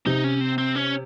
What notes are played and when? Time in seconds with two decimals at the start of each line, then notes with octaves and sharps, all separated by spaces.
0.06 C3 D#4
0.24 C#4
0.41 C4
0.58 C4
0.75 C#4